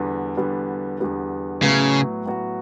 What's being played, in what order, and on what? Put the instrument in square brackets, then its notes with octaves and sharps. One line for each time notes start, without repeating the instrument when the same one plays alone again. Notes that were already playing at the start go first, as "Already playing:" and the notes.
Already playing: [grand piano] E2 D3 G3 B3
E2 D3 G3 B3
E2 D3 G3 B3
[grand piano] A2 F#3 B3 F#4 [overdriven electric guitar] C#3
[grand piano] A2 F#3 B3 F#4